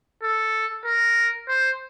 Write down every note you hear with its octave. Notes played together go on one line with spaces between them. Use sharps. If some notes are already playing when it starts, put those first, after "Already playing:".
A4
A#4
C5